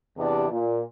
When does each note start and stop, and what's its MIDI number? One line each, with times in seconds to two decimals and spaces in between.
0.18 0.50 40
0.18 0.50 48
0.18 0.50 52
0.18 0.50 62
0.18 0.50 67
0.18 0.50 74
0.51 0.81 46